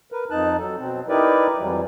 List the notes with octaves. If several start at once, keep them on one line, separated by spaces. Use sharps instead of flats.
A#4 B4
F2 D#4 A5 F#6
F#3 A4
B2 C4
D#4 E4 G4 A#4 B4 D5
F2 E3 F#3 G3